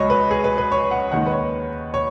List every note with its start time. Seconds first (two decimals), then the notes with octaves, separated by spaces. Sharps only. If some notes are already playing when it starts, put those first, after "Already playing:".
Already playing: C#2 C#3 F#3 C#5 D#5 B5
0.10 B4
0.31 G#4
0.44 B4
0.58 B4
0.72 C#5
0.91 F#5
1.12 D#2 D#3 G#3 F#5
1.26 B4
1.32 C#5
1.94 C#5